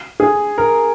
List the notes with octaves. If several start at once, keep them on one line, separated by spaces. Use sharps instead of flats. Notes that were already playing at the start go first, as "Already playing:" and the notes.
G#4
A#4